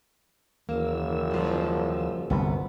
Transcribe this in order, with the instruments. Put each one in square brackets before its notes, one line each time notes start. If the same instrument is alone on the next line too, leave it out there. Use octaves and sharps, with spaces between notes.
[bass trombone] F#1 [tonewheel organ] D#2 E3 E6 [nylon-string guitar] A#3
[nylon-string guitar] F3 G3
[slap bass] G1 C2 [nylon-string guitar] B3